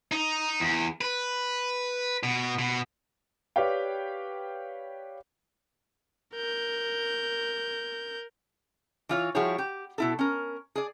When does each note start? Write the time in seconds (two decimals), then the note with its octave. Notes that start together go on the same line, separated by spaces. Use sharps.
0.12 D#4
0.60 E2
1.01 B4
2.23 B2
2.59 B2
3.56 G4 B4 C#5 D5 F5 G5
6.34 A#4 G6
9.09 E3 F4 C#5
9.35 F3 G3 E4 F#4 G#4 C#5
9.58 G4
9.98 B2 E4 A4
10.19 C#4 A#4
10.76 G#4 D5